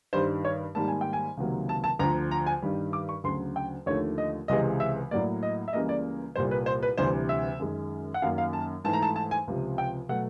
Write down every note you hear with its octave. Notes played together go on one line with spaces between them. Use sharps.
G2 D#3 G3 C5
C#5
G#2 D#3 G3 A#3 A5
G#5
G5
G#5
C#2 C3 D#3 F#3 A#3
A5
A5
D2 D3 F3 A#5
A#5
G#5
G2 D#3 G3
D6
C#6
D2 C#3 F#3 C6
G5
D#2 D3 F3 A3 C#5
D#5
C#2 C3 E3 G#3 D#5
E5
A2 F#3 A#3 D5
D#5
E5
C#2 C#3 E3 G3 A#3 D#5
D5
C2 A#2 G3 C5
B4
C5
B4
D2 C3 E3 G3 C5
E5
F#2 D#3 G#3
F#5
F#2 D#3 F#3 A#3 F5
F5
A5
G#2 E3 A3 A5
A#5
A5
A5
G#5
C#2 C3 F3
G5
B2 F#3 A3 F#5